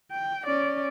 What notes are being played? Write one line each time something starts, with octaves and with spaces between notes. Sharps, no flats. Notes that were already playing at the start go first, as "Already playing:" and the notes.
G5
C#4 D5